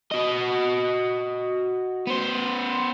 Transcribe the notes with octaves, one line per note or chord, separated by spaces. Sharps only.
F#4 D#5
B3 C5